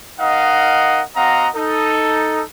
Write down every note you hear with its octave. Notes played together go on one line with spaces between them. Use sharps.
D#4 A#4 D#5 F5 F#5
C4 F#4 D#5 F5 F#5 A#5
D#4 A4